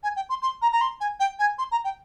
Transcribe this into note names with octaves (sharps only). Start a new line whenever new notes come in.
G#5
G5
C6
C6
A#5
A#5
C6
G#5
G5
G#5
C6
A#5
G5